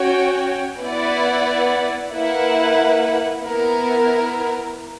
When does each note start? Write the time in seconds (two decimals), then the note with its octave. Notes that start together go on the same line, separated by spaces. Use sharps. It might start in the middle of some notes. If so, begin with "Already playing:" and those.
Already playing: C#4 F#4 C#5 G5
0.80 B3 E4 B4 D5 F#5
2.12 A#3 E4 B4 F#5
3.42 B3 E4 A#4